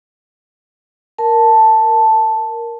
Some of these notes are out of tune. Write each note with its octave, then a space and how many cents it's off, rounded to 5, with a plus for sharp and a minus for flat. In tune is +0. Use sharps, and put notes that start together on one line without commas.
A#4 +0 A5 +0